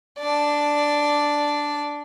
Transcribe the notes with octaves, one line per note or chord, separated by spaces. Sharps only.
D4 D5